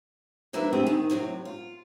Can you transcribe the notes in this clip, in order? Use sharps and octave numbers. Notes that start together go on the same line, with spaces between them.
G#2 F3 A#3 D4 B4 E5
A2 D3 F#3 C4 G4 G#4
D#3
A2 C3 E3 F#3
F4